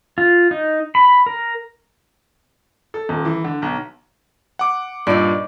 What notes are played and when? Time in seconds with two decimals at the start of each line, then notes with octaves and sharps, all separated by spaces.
0.18 F4
0.51 D#4
0.95 B5
1.26 A#4
2.94 A4
3.09 D#1
3.25 E3
3.44 D3
3.62 B1
4.59 F#5 D6
5.07 G2 A#2 D#4 D5